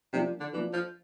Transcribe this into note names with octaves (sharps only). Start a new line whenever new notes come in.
C3 F3 A#3 D4 F4
D3
E3 F3 A#3 D4 F4
F3